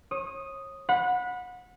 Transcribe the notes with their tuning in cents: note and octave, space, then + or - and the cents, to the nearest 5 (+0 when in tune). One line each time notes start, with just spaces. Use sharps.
C#5 -30 D#6 +0
F#5 -30 B5 +0